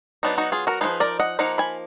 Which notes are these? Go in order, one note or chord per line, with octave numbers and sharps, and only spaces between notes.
F#3 B3 D4 D#4
D#4 F#4
F4 G#4
F#4 A#4
F3 B3 D#4 G#4 B4
A#4 D5
D#5 F#5
F3 A#3 D#4 F#5 A#5
G#5 B5